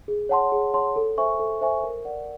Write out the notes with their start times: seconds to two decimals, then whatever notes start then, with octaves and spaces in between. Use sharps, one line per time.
0.08 G#4
0.29 C#5 F#5 A5 C6
0.52 G#4
0.74 C#5 F#5 A5 C6
0.96 A4
1.17 C5 E5 G#5 C#6
1.39 A4
1.61 C5 E5 G#5 C#6
1.83 A#4
2.05 D5 F#5